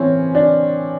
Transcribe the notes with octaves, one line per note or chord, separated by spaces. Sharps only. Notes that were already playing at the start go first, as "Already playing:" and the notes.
Already playing: A2 E3 C4 C#4
D4